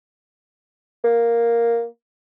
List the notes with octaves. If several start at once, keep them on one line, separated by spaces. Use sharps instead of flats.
A#3